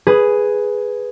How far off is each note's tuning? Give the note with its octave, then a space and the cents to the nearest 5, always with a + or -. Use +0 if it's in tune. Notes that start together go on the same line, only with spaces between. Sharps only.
G#4 +0 B4 +0